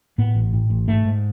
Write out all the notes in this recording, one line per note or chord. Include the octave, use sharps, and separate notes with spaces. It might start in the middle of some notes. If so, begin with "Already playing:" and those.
A2 B3
A1
A2
A1
G#2 A3
G#2